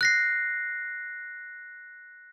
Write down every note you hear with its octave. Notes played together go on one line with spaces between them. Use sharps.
F#6 A#6 C7